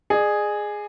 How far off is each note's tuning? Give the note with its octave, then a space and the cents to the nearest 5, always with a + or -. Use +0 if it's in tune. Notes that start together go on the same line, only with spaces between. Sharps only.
G#4 +0 D5 +45